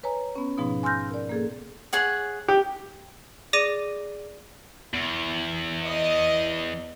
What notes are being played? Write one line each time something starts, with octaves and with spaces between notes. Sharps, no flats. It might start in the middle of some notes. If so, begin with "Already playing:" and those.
B4 C#5 G#5 A#5
B3 C#4
G#2 B2 F3 B3 D#4
G#5 C6 E6 F6 G6 A#6
A#4 D5
A#3 G#4 A4
G#4 C#5 F#5
G4
G#4 D5 D6 A#6 D#7
E2
D#5